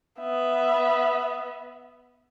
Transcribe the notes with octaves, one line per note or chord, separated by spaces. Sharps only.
B3 E5